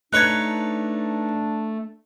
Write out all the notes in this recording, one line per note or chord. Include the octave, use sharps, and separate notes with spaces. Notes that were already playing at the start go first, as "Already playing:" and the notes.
A3 D4 D#4 B4 C#5 F#6 G#6